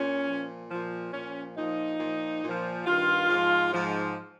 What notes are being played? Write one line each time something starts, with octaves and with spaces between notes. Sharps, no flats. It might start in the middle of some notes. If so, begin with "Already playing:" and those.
Already playing: A#2 C#4
A#2 F3
A#2 F3
A#2 F3 C#4
A#2 F3 D#4
A#2 F3
A#2 F3
G2 D#3 F4
G#2 F3
G#2 F3